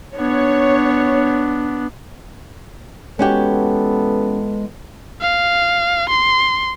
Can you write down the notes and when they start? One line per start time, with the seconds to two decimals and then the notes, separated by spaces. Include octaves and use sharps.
0.17 B3 D4 C#5
3.19 E3 G#3 B3 C#4 F#4 G4 A4
5.21 F5
6.09 C6